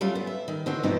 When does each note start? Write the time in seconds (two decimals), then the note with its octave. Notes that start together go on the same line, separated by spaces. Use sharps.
0.01 F#3 G3 A3 C#4 F4
0.15 B3
0.27 E5
0.48 D#3
0.66 D3 E3 C4 D#4 F#4
0.83 G2 B2 E3 F3 C4 D#4